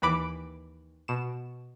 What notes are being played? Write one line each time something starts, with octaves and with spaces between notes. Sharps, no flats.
D#2 E3 B5 D6 D7
B2 E7